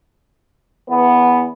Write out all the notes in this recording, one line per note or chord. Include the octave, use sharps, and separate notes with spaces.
E2 B3